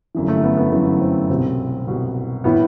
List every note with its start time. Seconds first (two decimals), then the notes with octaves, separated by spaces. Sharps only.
0.15 G1 F#2 E3
0.28 A3
0.44 B3
0.57 B3
0.72 G1 F#2 E3 A3
0.86 B3
1.01 C4
1.29 C2 B2 C4
1.87 C2 B2
2.44 A2 E3 B3